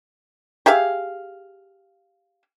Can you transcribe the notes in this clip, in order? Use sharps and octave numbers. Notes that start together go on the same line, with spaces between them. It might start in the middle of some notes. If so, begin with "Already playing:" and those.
G4 G#4 E5 F5